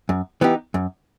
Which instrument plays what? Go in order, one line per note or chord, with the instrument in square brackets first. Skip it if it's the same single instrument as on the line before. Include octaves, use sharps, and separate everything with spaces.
[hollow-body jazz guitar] F#2
E3 B3 D#4 G4
F#2